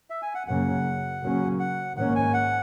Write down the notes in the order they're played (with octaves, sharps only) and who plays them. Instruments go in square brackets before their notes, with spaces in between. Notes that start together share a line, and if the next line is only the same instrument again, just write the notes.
[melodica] E5
G#5
F#5
[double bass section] F#2 C#3 F#3 A#3 C#4 [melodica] F#5
[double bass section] C#3 F#3 A#3 C#4
[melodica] F#5
[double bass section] G#2 D#3 A#3 C#4 [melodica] F#5
[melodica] G#5
F#5